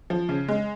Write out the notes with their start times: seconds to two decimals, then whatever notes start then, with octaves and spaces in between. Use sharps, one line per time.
0.10 F3
0.29 C#3
0.48 G#3